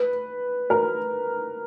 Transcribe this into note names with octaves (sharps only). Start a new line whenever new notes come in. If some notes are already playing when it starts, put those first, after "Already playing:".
Already playing: B4
A#4